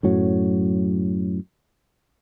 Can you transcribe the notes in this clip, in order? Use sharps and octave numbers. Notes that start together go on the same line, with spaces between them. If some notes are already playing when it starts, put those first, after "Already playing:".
F#2 A2 F#3